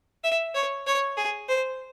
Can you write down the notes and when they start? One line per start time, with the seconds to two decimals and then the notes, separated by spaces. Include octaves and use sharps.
0.24 E5
0.55 C#5
0.87 C#5
1.17 G#4
1.49 C5